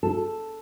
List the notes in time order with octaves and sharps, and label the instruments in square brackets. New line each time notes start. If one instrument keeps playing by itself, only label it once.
[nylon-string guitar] A4